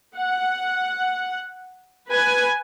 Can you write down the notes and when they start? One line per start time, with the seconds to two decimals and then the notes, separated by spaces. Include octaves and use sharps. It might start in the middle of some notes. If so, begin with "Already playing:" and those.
0.16 F#5
2.09 B4 G#5